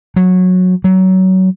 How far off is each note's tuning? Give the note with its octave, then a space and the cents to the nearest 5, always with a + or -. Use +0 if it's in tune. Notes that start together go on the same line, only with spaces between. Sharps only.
F#3 -15
F#3 +20